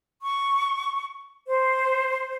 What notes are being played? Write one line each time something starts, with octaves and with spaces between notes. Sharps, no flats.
C#6
C5